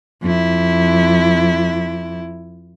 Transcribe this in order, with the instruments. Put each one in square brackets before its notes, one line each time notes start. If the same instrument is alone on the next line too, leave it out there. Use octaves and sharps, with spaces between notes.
[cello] F2 E4